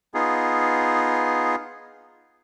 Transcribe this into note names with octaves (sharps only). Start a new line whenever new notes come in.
B3 D#4 F4 G#4